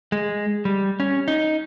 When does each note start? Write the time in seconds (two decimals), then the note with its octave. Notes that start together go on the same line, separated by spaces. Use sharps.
0.12 G#3
0.65 G3
1.00 C#4
1.28 D#4